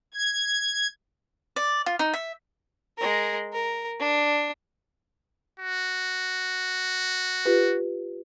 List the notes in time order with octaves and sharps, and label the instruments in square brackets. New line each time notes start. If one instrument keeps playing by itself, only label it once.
[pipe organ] G#6
[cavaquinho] D5
F4
D#4
E5
[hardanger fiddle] G#3 A#4
A#4
D4
[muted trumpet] F#4
[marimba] F4 G4 B4